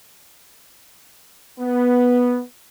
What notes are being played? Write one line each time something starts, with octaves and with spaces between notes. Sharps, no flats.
B3